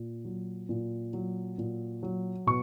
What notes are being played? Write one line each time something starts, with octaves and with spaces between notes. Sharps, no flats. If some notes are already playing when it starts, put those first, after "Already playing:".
Already playing: A#2
F#3
A#2
F#3
A#2
F#3
B2 C#6